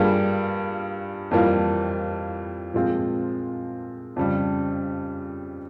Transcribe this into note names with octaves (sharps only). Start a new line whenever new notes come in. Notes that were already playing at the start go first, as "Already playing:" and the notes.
Already playing: G2 G3 A#3 F4 G#4
F2 E3 G3 A#3 F4
A#2 F3 G#3 C4 F4
F2 C#3 G3